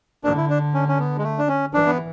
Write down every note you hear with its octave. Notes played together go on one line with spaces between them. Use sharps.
D3 D4
E4
D4
C#4
C#4
B3
G#3
A3
D4
C#4
E3 D4
B3